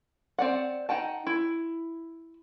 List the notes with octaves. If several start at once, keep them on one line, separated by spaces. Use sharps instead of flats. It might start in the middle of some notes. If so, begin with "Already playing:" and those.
C4 D5 F#5
D#4 F#5 G5 A5
E4